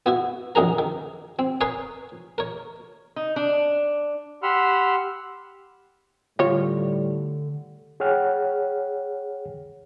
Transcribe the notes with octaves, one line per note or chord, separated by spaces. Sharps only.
B3 E4 F#4
A#1 F#2 D4 G#4 A#4 A#5
D#3
C4
A#4 B4 C#5 G#5 C6 D#6
A#4 C#5
D#4
D4
G4 F#5 B5 C6 E6 F6
A2 D3 G3 F4 C#5
G#4 C#5 F#5 G5 F6